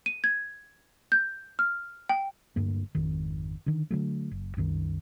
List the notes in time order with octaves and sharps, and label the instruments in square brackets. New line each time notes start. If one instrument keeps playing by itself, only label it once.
[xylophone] D#7
G#6
G6
F6
G5
[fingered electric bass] D1 D2 G2 A#3
G#1 F2 D#3
D3 D#3
D3 F#3 A3
F#1
C2 F#2 D#3